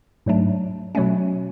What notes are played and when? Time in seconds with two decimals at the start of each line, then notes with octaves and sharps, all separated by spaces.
0.26 G#2 F#3 A3 D4
0.95 B2 F#3 A3 C#4